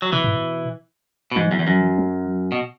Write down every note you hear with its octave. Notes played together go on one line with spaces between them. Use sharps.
F#3
B2 E3
G#2
B2
B2
G#2 E3
E2 F#3
E2 E3
F#2 F#3
E3
F#3
B2